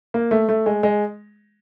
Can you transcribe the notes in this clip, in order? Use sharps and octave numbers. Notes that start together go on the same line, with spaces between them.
A#3
A3
A3
G#3
G#3